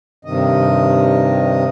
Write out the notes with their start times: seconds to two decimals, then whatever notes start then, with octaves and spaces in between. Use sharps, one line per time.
0.25 G2 C3 D#3 D#5